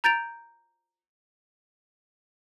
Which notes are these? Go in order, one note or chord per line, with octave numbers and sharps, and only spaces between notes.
A#5 G6 A6 D7 F7